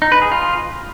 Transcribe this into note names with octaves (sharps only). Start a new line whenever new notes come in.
D#4
B4
G#4
F4